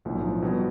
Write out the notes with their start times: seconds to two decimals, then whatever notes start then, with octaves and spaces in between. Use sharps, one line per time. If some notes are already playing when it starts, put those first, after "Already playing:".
0.05 B1 A2 F3 A#3 D4
0.42 B2 G3 C4